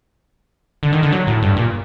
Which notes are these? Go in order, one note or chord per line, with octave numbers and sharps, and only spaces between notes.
D3
D#3
D3
F#3
A2
G2
A#2